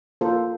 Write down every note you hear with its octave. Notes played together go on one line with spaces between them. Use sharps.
A#3 F4 A4 C5